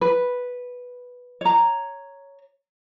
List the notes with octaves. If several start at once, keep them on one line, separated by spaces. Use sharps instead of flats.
B4
C#5 A#5